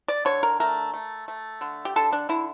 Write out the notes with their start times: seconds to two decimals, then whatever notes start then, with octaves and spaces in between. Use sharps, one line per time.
0.08 D5
0.25 D3 C#5
0.43 A#4
0.60 A3 A#4
0.94 A3
1.28 A3
1.61 D3
1.85 G4
1.96 D3 A4
2.13 D4
2.29 D3 E4